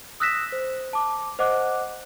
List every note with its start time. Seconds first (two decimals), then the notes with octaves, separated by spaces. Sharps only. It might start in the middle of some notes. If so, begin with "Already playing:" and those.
0.20 D#6 E6 F#6 A#6 B6 E7
0.52 C5
0.93 A5 D6
1.39 C5 D#5 F#5 D6 F#6